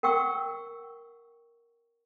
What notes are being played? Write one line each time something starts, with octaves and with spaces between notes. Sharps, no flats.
A#4 F#5 G5 C#6 E6